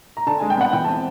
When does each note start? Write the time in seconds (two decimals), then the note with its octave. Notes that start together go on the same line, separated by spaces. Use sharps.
0.17 A#5
0.27 D3 A5
0.38 G#3 G#5
0.50 G5
0.57 B3 F#5
0.73 E3 G5
0.85 C4 A5